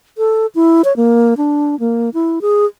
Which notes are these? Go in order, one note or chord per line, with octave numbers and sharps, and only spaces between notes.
A4
E4
C#5
A#3
D4
A#3
E4
G#4